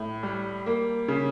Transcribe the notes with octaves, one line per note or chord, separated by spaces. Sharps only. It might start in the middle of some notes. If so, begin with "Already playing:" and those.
Already playing: A2
G3
A#3
C#3